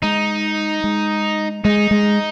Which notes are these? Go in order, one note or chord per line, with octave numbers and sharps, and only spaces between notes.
G#3 D#4
G#3
G#3 D#4
G#3